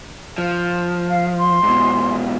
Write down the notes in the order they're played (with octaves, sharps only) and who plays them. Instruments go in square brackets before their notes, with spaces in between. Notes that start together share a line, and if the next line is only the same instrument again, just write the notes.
[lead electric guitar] F3
[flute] F5
C6
[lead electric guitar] G#2 B2